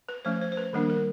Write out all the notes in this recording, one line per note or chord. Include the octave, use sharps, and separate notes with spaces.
B4
F3 A3 C#4 C5
C5
C5
B4
D#3 G3 A#3 D4 A#4
A#4